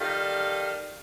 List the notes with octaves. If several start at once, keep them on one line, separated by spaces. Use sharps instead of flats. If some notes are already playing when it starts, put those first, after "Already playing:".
D#3 G3 A4 F5